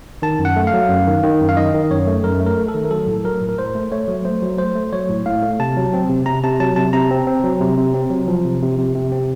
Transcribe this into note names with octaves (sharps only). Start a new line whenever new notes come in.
D#3 A5
F#2
F#5
A3
F5
F#3
F#2
D#3
D#3
F#2
F5
D#3 D#5
D#3
F#2 C#5
A3
F#2 A#4
A3
A#4
A3
A4
D#3
A#4
F#3 A4
A2
F#3 A#4
A2
A#4
A2 C5
A3
A3 C#5
F#3
A3 C5
F#3
A3 C5
A3
F#3 C#5
A2
A2 F5
A3
C3 A5
F#3
C4
C3
C3 A#5
C3 A5
F#3 A5
C3 A5
C3 A#5
C4
C4
F#3
C3
C3
C4
F#3
F3
C3
C3
C3
C3
C4